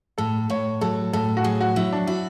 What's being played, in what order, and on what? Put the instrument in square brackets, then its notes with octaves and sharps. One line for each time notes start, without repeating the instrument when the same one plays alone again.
[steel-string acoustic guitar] A2 [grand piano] A4
[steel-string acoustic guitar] A2 [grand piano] C#5
[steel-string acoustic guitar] F#3 [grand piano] A4
[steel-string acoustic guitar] A2 [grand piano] A4
[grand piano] F#4
[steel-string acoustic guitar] F#3 [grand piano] G#4
[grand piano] F#4
[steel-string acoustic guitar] F#3 [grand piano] E4
[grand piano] D4
[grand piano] E4 [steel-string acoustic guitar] F#4